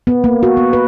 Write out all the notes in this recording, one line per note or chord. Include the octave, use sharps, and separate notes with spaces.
B3
A#3
F#4
B3
B4